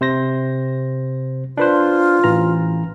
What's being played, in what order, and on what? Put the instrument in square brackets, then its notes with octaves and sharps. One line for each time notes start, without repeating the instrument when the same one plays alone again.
[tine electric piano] C3 C5 A#6
[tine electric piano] D4 B4 C5 [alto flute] F4
[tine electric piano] A1 E3 A#5